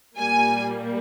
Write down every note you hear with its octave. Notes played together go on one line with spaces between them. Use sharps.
A#2 G3 A#3 G#5